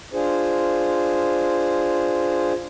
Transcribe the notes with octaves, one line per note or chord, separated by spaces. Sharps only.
D4 F4 G#4 C5